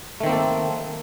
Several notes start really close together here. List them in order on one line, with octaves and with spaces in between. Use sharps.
A3 D#3 C4 A#3 A4